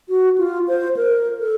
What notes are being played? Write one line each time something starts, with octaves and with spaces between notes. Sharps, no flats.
F#4
F4
C5
A#4
A4